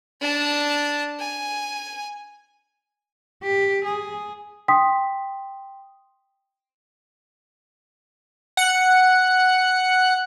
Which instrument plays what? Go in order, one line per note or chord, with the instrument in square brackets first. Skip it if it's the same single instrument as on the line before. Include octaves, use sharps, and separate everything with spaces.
[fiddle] D4 A5
G#5
[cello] G4
G#4
[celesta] G5 C6 D#6 B6
[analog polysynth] F#5 C#7